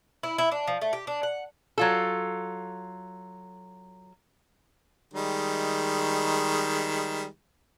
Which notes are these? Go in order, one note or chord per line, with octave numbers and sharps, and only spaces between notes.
E4
E4
D4
F3
A3
G4
D4
F#5
F#3 F4 A4
D#3 G3 G#3